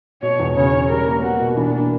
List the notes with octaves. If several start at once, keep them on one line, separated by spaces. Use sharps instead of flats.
B2 C#5
E2
C#3 C#5
C#4
G3 A#4
A#3
B3 F#4
B2
E3 D4
A#3